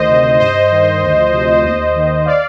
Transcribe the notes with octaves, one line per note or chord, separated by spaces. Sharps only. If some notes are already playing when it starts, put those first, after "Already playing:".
Already playing: D2 D#3 C5 D#5
C3
D2
G2 C5 D#5
G2
D#3
D#3
D2
F3
C3
D2
D#2 C5 D#5
D#2
D#3
D#3
D5 F5